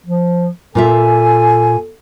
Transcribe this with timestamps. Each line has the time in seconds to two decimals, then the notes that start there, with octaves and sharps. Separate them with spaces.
0.06 F3
0.75 A#2 F4 A4 E5 G#5